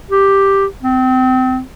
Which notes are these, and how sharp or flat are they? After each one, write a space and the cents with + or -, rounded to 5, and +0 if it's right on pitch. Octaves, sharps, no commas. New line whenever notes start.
G4 +0
C4 -30